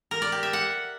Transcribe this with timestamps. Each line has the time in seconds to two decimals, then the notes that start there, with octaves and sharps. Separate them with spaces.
0.11 A#4
0.22 D5
0.32 G4
0.43 E5
0.53 F#5